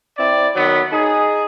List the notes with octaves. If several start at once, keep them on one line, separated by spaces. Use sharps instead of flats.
C4 E4 D5
D#3 F#3 B3
D#4 G#4